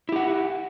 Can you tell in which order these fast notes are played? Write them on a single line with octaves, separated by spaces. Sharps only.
E4 G4 F#5